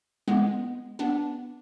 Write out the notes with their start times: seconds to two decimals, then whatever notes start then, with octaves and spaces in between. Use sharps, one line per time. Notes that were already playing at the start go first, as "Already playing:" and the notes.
0.28 G#3 B3
0.99 B3 D4